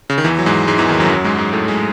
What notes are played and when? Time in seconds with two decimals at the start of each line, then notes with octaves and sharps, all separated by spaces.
0.10 C#3
0.18 D#3
0.24 E2 E3
0.39 F#3
0.46 G#2 G#3
0.67 G#2 G#3
0.78 E2 E3
0.89 D#2 D#3
1.00 F#2 F#3
1.06 E3
1.10 F#2 F#3
1.24 G#2 G#3
1.38 G#2 G#3
1.53 A2 A3
1.68 G#3